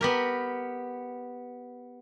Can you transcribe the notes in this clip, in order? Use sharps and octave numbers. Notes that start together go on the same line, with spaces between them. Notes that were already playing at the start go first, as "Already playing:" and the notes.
B3 G4 A#4